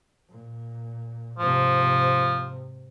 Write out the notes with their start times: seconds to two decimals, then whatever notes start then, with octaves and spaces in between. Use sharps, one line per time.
0.29 A#2
1.39 G#2 C3 F3